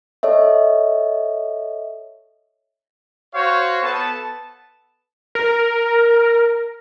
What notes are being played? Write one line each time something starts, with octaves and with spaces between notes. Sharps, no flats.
A4 C#5 D#5 E5
F#4 C5 C#5 F5 C#6
B3 A4 A5
A#4